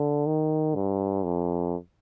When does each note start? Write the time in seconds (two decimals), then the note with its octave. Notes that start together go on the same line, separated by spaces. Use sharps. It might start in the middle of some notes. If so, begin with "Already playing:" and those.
Already playing: D3
0.26 D#3
0.75 G2
1.24 F2